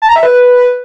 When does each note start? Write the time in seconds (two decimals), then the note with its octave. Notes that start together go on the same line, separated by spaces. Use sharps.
0.02 A5
0.09 A#5
0.16 E5
0.23 B4